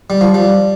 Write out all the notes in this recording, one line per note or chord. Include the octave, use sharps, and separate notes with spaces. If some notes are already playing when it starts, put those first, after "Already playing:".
G3
F3
G3